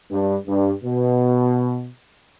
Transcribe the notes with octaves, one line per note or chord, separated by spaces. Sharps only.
G2
G2
B2